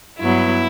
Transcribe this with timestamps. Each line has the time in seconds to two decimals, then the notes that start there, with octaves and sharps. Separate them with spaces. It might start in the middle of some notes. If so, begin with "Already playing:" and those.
0.19 G2 F#3 B3 E4